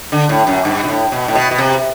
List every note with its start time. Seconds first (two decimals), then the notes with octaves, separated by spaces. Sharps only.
0.12 D3
0.29 A2
0.47 F#2
0.65 G2
0.84 B2
0.88 A2
1.12 B2
1.28 A2
1.35 B2
1.51 B2
1.58 C3